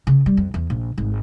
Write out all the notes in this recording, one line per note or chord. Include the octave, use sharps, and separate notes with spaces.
C#3
G3
F2
E2
A#1
G#1